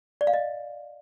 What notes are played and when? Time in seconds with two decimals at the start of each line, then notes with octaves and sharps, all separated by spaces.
0.21 D5
0.27 F5
0.34 D#5